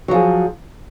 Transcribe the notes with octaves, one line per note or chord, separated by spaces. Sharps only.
F3 F#3 G#4